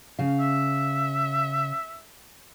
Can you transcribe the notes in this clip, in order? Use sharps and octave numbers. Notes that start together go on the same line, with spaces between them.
C#3 F5
E5